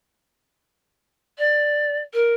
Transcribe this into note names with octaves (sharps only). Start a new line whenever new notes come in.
D5
A#4